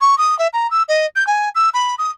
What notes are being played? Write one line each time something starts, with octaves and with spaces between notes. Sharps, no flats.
C#6
D#6
E5
A#5
E6
D#5
G6
G#5
E6
B5
D#6